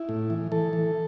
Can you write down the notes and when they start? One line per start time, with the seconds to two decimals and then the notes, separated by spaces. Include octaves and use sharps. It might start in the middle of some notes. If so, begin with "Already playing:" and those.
Already playing: E4
0.09 A2
0.30 E3
0.52 E3 A4
0.73 E3